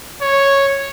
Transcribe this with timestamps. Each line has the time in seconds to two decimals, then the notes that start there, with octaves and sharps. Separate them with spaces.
0.22 C#5